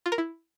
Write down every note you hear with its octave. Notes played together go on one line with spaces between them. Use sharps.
F4
A#4
E4